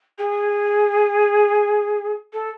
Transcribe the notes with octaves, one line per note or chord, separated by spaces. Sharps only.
G#4
A4